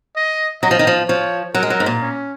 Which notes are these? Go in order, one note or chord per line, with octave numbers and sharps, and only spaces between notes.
D#5
F#3 D#5
F3
D#3
F3
F3 C#5
F#3 A#4
G#3
F#3
G#2
A#2
C#4